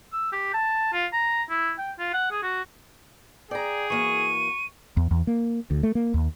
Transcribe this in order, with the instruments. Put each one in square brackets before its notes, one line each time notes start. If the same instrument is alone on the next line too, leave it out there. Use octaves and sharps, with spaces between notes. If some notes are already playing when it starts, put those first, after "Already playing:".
[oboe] E6
G4
A5
F4
A#5
E4
G5
F4
F#5
G#4
F#4
[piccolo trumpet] G#4 [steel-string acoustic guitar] D5 A#5 [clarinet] G5
[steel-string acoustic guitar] E3 A#3 F#4 [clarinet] C#6 [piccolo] D#7
[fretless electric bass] E2
E2
A#3
D2
A3
A#3
D#2